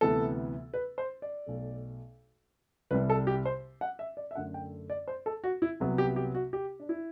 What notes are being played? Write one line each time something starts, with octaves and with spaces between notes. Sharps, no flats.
D2 C3 E3 B3 A4
B4
C5
D5
B1 B2 A3
C2 C3 G3 B4
A4
G4
C5
F#5
E5
D5
E5
F#2 D3 A3 F#5
G5
D5
C5
A4
F#4
E4
C2 C3 F#3 B3
G4
G4
F#4
G4
D4
E4